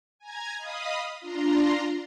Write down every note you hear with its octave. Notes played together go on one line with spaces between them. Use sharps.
G#5 A#5 G#6
D#5 F5 B5 D#6
D4 F4 A#5 C6